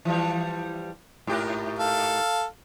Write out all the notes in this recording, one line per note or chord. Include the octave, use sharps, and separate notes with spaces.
E3 F3 G3
G#2 G4 A#4
A4 F5